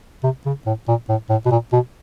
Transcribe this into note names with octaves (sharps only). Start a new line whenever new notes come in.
C3
C#3
A2
A#2
A2
A2
B2
A#2
B2